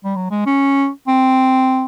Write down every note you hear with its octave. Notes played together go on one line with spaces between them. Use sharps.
G3
F#3
G#3
C#4
C4